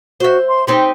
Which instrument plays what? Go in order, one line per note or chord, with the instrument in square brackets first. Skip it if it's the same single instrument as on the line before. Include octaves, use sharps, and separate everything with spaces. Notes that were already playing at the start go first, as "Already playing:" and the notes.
[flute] F#4 [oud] C5 E5
[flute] C6
[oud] C4 D#4 G4 [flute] C6